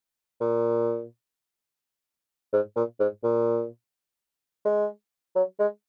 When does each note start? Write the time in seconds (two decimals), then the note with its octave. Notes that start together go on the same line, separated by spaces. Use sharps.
0.41 A#2
2.53 G#2
2.76 A#2
3.00 G#2
3.23 A#2
4.65 G#3
5.36 F#3
5.59 G#3